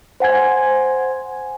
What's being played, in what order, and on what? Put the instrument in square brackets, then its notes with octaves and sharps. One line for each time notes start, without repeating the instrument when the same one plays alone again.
[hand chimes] C5 F#5 G#5 G#6